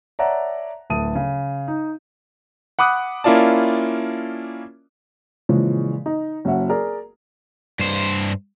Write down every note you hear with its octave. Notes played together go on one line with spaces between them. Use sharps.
C#5 D5 E5 F#5 A5 A#5
D1 D2 A5 D#6 D#7
C#3
D#4
F#5 B5 D6 D#6 F#6
A#3 C#4 E4 F4 D5 A5
A#2 C#3 E3 F3 G#3
D#4
F#1 C#4 F#4 E5 F#5
G#4 A#4 D5
G2 C5